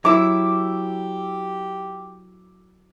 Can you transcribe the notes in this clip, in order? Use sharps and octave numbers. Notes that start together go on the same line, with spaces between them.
F#3 E4 G4 D6 E6